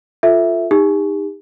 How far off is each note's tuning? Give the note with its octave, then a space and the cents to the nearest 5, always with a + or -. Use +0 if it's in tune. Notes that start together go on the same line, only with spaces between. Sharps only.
F4 +0 A4 +0 E5 +0
D#4 +0 G4 +40